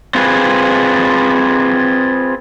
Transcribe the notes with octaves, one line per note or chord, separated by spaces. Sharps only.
C4 F4 G#4 B4